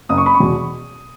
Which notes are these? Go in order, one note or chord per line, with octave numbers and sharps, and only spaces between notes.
F#1 D#6
C#6
B5
C#6
E2 B2